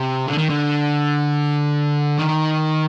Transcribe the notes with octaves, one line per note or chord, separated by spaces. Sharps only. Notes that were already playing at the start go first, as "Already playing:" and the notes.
Already playing: C3
D3
D#3
D3
D#3